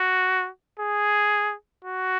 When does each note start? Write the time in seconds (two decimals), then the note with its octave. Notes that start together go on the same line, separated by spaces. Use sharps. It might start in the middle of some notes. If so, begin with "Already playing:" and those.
Already playing: F#4
0.80 G#4
1.85 F#4